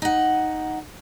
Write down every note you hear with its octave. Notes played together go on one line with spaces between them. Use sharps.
D#4 F#5